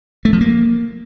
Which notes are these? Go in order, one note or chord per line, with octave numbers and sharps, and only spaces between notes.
A3
F3
A#3